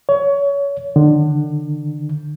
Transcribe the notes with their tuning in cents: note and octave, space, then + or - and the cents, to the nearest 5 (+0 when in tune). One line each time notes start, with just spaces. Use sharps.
C#5 +25
D3 +30